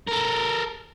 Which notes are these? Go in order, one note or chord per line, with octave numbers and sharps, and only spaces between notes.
A4 A#4